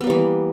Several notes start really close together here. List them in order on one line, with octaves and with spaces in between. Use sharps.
B3 A#3 G3 E3